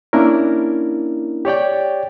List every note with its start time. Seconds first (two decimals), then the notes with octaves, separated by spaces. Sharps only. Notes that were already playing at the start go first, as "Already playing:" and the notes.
0.13 A#3 C#4 D4 E4 A#4
1.45 G4 C#5 D5 G5